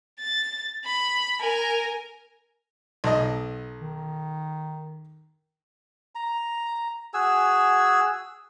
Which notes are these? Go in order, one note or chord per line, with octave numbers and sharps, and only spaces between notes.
A6
B5
A#4 G#5
B1 D#5
D#3
A#5
F#4 G#4 G#5 E6